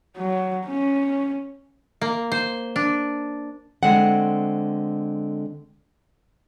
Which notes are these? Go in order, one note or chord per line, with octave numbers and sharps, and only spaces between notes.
F#3
C#4
A#3
C5
D4
D3 G#3 A3 C4 F#5